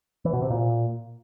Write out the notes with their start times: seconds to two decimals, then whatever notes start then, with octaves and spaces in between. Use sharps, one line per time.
0.25 E3
0.33 B2
0.42 C3
0.50 A#2